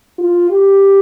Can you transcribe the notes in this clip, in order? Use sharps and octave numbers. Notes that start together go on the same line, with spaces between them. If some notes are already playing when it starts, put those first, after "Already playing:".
F4
G4